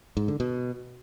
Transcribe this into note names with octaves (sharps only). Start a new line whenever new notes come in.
G#2
D3
B2